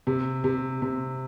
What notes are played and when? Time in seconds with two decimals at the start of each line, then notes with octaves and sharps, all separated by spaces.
0.07 C3
0.44 C3
0.82 C3